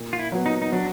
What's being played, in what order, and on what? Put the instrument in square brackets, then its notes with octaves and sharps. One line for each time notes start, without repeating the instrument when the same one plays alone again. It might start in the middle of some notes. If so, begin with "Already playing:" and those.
Already playing: [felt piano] A#2
[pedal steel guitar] F4
E4
[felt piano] F#3 B3
[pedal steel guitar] D#4
D#4
[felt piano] F#3 [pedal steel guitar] D4